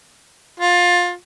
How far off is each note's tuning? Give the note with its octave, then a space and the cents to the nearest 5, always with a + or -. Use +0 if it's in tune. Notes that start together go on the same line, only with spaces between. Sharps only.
F4 +20